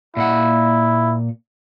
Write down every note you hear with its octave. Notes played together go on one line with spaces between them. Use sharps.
A#2 E4 F#5